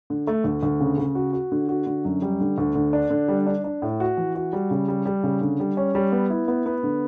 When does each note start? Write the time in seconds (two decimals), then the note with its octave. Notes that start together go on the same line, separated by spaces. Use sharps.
0.10 D3
0.27 A3
0.44 D2
0.63 D2
0.80 C#3
0.98 C#3
1.15 F#4
1.33 F#4
1.52 D3
1.69 F#4
1.86 D3
2.05 F#2
2.22 G3
2.41 D3
2.58 D2
2.75 D3
2.93 D4
3.10 D3
3.28 G3
3.46 D4
3.64 D4
3.82 A2
4.00 F#4
4.17 E3
4.35 F#4
4.53 G3
4.71 C#3
4.88 G3
5.05 G3
5.23 C#3
5.41 D3
5.60 G3
5.77 C#4
5.95 G3
6.12 B3
6.30 E4
6.48 B3
6.66 B3
6.83 D3